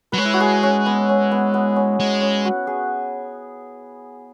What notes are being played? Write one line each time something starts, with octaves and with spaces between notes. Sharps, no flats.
F#3 B4
G#3 C#5
E4
F#4
G#4
C#4
B3
C#4
B3
B3
C#4
G#3
C#4
F#4
G#4